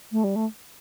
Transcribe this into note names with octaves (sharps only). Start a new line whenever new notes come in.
A3
G3
A3